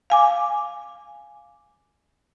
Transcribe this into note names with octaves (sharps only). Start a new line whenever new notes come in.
F5 G#5 D6